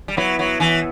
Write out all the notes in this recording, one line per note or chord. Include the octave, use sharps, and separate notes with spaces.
G3
F#3 B3 E4 B4
F#3
E3